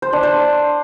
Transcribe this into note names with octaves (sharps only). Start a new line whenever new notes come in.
C5
D4
C5